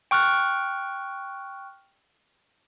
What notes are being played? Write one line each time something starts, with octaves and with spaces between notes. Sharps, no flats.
G5 C#6 F6 F#6